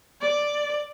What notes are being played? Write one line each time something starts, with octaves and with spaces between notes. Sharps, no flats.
D5